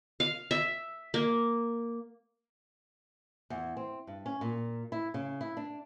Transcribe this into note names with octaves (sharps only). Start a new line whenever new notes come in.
F5
E5
A#3
E2
C4
G2
C#4
A#2
E4
C#3
E4
D4